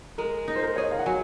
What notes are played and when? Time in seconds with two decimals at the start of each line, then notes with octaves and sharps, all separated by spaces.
0.18 G#3 A#4
0.48 D#4
0.56 C5
0.62 A#4
0.76 G#4 C#5
0.84 D#5
0.91 F5
0.99 F#5
1.06 F#3 G#5